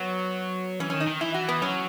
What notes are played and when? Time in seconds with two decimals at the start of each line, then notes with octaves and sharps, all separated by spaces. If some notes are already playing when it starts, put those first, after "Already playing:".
Already playing: F#3 B3
0.80 E3 C#4
0.90 D#3 C#4
1.00 D#4
1.07 D#3
1.21 E3 E4
1.34 F#4
1.49 B3
1.61 F#3 C#4